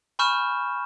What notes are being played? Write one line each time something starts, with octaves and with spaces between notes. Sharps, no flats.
G#5 B5 C#6 F6 G6 E7